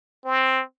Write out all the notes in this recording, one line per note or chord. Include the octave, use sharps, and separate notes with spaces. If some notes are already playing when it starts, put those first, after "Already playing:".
C4